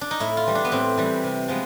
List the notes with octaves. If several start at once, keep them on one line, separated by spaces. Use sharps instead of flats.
D4
D#4
A2 E4
F4
E3 G3
D4
B3
A2 C4
E3 G3
C3
F3 G#3 B3